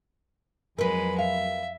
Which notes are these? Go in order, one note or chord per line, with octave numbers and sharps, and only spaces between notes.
F2 F#3 G#3 A#4 B4 B5
E5 F5